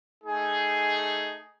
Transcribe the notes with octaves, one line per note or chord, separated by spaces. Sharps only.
A3 D#4 G#4